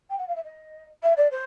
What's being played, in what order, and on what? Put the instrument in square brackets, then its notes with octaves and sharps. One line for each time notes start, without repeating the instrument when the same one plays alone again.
[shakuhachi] G5
F#5
F5
E5
D#5
E5
D5
C5